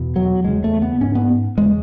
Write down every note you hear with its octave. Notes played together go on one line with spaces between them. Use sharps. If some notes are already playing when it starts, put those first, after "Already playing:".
Already playing: E2 B2
F#3
E2 C#3 G#3
A3
B3
G#2 C#4
B3
E2 C#3 G#3